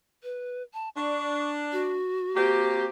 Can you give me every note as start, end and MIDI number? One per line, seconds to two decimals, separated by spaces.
0.23 0.62 71
0.74 0.89 81
0.96 1.97 62
0.96 1.51 85
1.72 2.87 66
2.37 2.88 58
2.37 2.88 60
2.37 2.88 67